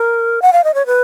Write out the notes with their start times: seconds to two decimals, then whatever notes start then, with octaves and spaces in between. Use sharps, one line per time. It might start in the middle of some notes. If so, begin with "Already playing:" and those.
Already playing: A#4
0.42 F#5
0.53 F5
0.64 D#5
0.75 C#5
0.86 B4